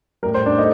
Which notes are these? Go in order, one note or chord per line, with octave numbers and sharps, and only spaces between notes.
A2 G3 A#4
C5
D4
A3 D#4